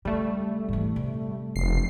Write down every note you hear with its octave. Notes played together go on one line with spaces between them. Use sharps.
C#3 G3 A3
G#2 E3
C3
F1 C7